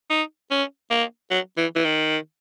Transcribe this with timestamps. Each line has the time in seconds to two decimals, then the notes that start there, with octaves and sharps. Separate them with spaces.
0.10 D#4
0.51 C#4
0.91 A#3
1.31 F#3
1.58 E3
1.76 E3
1.85 D#3